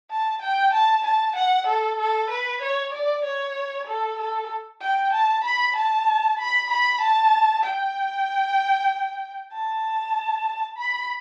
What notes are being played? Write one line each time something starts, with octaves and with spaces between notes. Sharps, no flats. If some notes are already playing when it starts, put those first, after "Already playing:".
A5
G5
A5
A5
F#5
A4
A4
B4
C#5
D5
C#5
A4
A4
G5
A5
B5
A5
B5
B5
A5
G5
A5
B5